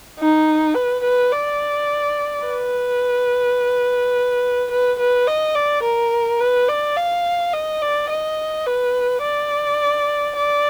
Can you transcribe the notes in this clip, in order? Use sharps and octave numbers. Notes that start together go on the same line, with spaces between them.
D#4
B4
B4
D5
B4
B4
B4
D#5
D5
A#4
B4
D5
F5
D#5
D5
D#5
B4
D5
D5